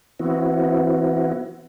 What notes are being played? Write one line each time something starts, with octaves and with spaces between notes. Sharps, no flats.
E3 B3 C4 E4 F#4